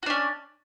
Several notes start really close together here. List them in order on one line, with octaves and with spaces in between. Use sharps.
F#4 D4 C#4